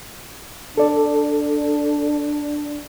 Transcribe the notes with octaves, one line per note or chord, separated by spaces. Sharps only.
D4 A4 D5